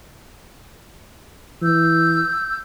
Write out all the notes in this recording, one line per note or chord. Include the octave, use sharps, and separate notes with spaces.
E3 E6 G6